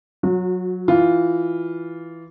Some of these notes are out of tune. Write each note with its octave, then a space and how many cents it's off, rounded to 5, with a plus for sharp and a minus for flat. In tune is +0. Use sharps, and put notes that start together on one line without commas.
F#3 -10 F#4 -35
E3 +0 F4 +0